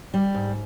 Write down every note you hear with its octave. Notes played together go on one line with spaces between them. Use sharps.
G3
G#2